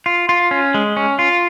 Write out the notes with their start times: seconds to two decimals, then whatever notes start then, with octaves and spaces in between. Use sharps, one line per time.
0.06 F4
0.29 F4
0.51 C#4
0.74 G#3
0.97 C#4
1.19 F4